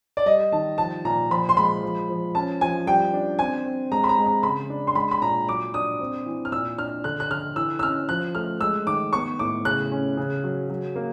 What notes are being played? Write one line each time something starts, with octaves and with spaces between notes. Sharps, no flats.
D5
G3 D#5
D#3 A5
F3 A5
A#2 A#5
F3 B5
C6
G#3 B5
F3
F3
C#4 A5
F3 G#5
G3 G5
D4
C4 G#5
C4
G#3 A#5
B5
A#5
G#3
A#5
C#3 B5
D4
C6
G#3 B5
B5
A#2 A#5
F#3 D6
D4 D#6
C4
E3
F6
A#2 E6
D4 F6
D3 F#6
F#6
D3 F6
E3 E6
E6
C#4 F6
F3 F#6
A3 F6
G#3 E6
D#3 D6
B3 C#6
A2 D6
C#3 F#6
C#4
C#3
F#3
F#3
A#3